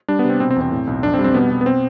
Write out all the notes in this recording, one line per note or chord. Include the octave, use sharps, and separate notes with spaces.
G3 D4
B3
C3 C4
B2 C4
C4
E2
C4
A2
B1
F2 D4
C4
G3
C4
B2 B3
B2
B3
C4